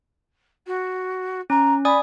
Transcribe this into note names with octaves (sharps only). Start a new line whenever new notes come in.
F#4
C#4 A#5
D5 G#5 B5 D#6